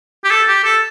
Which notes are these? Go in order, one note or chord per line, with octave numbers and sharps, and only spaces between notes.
G4
A4
G4
A4